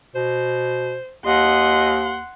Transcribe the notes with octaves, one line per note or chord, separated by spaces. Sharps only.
B2 C5
D#2 D#5 F#5 C6